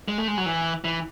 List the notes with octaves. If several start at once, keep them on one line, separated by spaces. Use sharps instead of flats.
G#3
A3
G#3
F#3
E3
E3